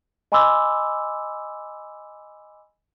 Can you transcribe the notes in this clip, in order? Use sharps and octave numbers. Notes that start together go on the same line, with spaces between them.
D#5 G#5 B5 C6 D6 E6